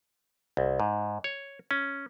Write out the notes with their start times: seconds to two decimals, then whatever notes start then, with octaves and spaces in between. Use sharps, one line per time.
0.57 C2
0.80 G#2
1.24 C#5
1.71 C#4